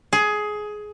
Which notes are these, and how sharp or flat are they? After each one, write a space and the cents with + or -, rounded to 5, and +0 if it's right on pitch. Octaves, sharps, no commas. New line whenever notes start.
G#4 +15